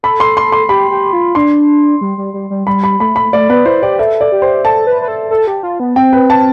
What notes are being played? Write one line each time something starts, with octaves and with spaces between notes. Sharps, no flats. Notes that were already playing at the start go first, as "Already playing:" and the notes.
A4 B5
C6
C6
C6
G4 B5
G4
F4
D4 C6
G3
G3
G3
G3
G3 B5
B5
A3 B5
B5
A3 D5
B3 B4
E4 C5
G4 D5
A4 E5
D5
G4
C5
A4 A5
B4
B4
A4
A4
G4
F4
B3
C4 G5
B4
A5